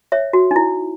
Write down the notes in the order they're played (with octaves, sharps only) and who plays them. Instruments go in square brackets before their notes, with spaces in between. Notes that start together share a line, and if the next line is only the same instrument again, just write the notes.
[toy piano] C#5 E5
F#4
D#4
E4